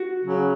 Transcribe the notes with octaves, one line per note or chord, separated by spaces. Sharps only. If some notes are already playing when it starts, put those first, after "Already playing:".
Already playing: F#4
C#3 F#3